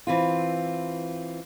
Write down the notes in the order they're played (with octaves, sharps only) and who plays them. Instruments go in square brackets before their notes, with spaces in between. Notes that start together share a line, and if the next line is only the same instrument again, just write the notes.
[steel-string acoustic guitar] E3 C4 F4